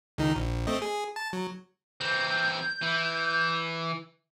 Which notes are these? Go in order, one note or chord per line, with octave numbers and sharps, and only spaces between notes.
C#2 D#3 D#4
A#1
A3 C4 D#5
G#4
A5
F#3
E3 C4 G6
E3